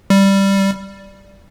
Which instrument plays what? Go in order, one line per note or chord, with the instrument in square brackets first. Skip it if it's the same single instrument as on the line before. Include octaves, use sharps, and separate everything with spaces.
[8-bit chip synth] G3